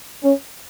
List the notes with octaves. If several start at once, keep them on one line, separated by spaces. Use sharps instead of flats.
C#4